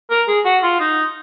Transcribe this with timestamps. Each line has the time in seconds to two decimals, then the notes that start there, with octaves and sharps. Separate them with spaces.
0.10 A#4
0.28 G#4
0.45 F#4
0.63 F4
0.80 D#4